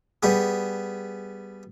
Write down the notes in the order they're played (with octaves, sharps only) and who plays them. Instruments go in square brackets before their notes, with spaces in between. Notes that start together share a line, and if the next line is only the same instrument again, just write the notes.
[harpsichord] G3 B3 G#4